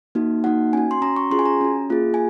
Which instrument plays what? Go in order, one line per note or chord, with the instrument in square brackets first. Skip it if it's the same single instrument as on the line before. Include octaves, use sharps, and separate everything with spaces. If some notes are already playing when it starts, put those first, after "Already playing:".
[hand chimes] A#3 D#4 F#4
A#3 D#4 F#4 F#5
C#4 F#4 G#5
C6
C#4 F#4 A#5
C#6
C#4 F4 G#4 C6
G#5
A#5
C#4 F#4
A#3 F4 G#4
G#5